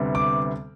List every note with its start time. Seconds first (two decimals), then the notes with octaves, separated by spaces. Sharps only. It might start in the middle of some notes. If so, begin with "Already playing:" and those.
Already playing: D2 C3 G3 B3
0.15 D6